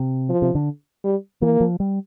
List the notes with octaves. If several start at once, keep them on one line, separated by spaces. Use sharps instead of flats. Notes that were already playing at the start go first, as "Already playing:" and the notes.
Already playing: C3
F3
C3
D3
G3
E3 A#3
F3
G3